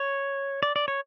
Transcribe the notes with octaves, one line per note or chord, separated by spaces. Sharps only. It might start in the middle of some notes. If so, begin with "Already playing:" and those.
Already playing: C#5
D5
D5
C#5